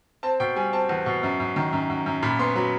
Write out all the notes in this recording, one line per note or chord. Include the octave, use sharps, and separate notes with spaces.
C4 A5
B2 G5
G3 G#5
C4 A5
E2
B2
F#2
F#2
D#3
F#2
F#2
F#2
A#2 B5
B3 C6
F#3 B5